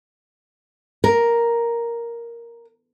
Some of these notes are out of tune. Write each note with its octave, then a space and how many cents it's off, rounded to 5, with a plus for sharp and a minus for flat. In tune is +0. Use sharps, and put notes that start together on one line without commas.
A#4 +5